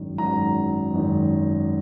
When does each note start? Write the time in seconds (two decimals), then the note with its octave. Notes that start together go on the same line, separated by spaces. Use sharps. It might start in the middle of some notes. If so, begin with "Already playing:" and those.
Already playing: G#1 F#2 D#3
0.18 G#1 F#2 D#3 A#5
0.93 G#1 F#2 D#3